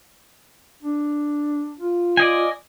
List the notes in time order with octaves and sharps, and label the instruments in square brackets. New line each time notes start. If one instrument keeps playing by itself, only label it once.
[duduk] D4
F4
[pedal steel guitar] D5 D#5 G#5